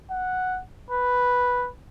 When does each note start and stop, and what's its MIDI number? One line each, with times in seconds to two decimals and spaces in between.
0.11 0.60 78
0.91 1.68 71